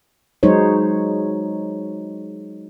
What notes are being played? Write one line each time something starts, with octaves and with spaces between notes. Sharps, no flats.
F#3 G#3 D#4 C5 C#5